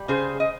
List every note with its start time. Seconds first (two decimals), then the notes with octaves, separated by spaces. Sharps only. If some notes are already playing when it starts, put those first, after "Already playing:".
Already playing: G3
0.08 C#3 G#4 C5
0.40 D#5